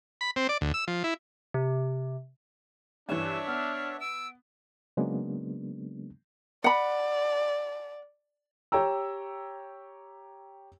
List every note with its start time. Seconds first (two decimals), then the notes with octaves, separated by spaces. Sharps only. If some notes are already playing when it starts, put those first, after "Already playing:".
0.21 B5
0.36 C4
0.49 D5
0.61 D2
0.74 E6
0.88 F3
1.04 E4
1.54 C3
3.09 G2 E3 D4 C#5 E5 E7
3.47 B3 F6
4.00 E6 D7
4.97 C#3 F#3 G#3 A#3 B3 D4
6.64 D5 F#5 B5
8.72 G4 C#5 G5 A#5 E6